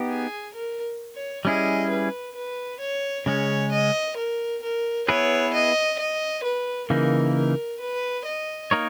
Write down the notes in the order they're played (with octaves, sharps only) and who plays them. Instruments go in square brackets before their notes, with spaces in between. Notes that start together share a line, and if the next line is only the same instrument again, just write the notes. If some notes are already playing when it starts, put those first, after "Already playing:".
Already playing: [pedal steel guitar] B3 D#4 G4
[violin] G#4
A#4
C#5
[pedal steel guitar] G3 C#4 E4 G#4 [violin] D#5
[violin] B4
B4
C#5
[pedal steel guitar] C#3 G#3 C#4 [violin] C#5
[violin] D#5
A#4
A#4
[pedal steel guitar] B3 E4 G#4 B4 [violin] C#5
[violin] D#5
D#5
B4
[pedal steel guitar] C#3 E3 A#3 D#4 [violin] A#4
[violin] A#4
B4
D#5
[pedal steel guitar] A#3 D#4 A#4 C#5